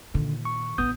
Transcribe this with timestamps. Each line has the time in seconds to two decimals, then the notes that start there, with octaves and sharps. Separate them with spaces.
0.14 A#2 D3 D#3
0.45 C#6
0.78 A1 B3 D4 D#6 G6